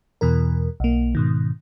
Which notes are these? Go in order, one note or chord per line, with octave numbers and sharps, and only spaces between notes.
E2 B2 E3 A#4
B1 A#3
G#2 B2 D#3